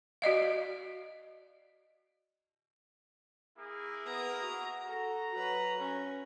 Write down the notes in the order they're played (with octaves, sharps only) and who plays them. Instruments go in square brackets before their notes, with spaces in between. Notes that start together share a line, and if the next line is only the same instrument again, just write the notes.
[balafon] F#4 D5 D#5 F5
[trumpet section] A#3 E4 G#4
[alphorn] B3 [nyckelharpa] A#5 D#6
[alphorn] F#4
[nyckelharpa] A4 [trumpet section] A#5
[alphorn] F#3 [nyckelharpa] B4
[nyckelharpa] C#4